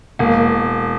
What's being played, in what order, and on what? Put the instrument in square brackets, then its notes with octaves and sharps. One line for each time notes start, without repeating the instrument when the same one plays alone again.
[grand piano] E1 [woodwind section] A#3